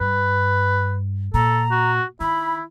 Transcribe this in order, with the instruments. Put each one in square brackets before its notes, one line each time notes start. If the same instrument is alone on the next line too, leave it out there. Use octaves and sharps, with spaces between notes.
[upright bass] G2 [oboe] B4
[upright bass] A#2 [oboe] A4 [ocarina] A#5
[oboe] F#4
[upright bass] D#3 [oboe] E4 [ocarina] B5